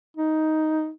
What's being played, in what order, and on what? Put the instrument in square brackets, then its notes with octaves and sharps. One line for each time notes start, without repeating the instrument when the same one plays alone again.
[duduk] D#4